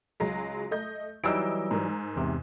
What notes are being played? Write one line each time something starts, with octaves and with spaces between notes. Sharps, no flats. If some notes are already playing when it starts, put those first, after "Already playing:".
C#2 F#3 G#3
A3 D#5 G6
E3 F#3 G3 D#4 E6 D7
G#2 A#4
E2 C3